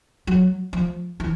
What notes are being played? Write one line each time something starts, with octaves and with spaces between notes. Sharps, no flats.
F#3
F3
E3